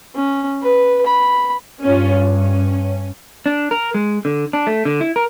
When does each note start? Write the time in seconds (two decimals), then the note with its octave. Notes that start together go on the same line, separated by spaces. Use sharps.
0.15 C#4
0.62 B4
1.06 B5
1.83 G2 C#4 F4
2.32 C#4
3.46 D4
3.71 A#4
3.94 G#3
4.25 D3
4.53 D4
4.67 A3
4.85 D3
5.01 E4
5.16 A#4